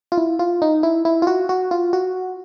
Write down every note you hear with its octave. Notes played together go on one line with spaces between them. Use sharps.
F4
E4
F4
D#4
E4
E4
F4
F#4
F#4
F4
F#4